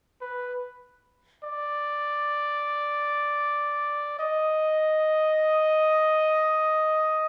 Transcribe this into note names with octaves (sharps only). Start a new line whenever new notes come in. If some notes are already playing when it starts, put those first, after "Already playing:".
B4
D5
D#5